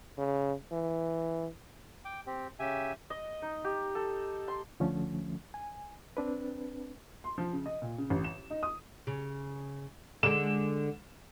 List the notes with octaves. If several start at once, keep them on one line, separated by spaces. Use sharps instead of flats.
C#3
E3
G5 D6
C4 G4
C#3 G4 E5 G#5
D#5
D#4
G4
A4
C6
C#2 D3 F3 A3 C#4
G#5
C4 D4 B4
C6
F3
C#3
D#5
A#2
C#3
A1
E7
D#4
D#6
C#3
D3 G#3 E7